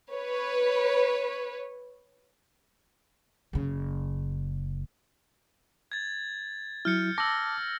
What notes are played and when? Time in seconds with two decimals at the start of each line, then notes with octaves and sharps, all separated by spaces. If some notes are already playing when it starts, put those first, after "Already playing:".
0.11 B4 C#5
3.53 F#1 C#3
5.92 G#6 A6
6.85 F#3 E4 F6 G6 C#7
7.18 A5 D6 E6 A#6